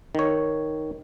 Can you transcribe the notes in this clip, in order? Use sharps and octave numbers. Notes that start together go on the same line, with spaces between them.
D#3 C#5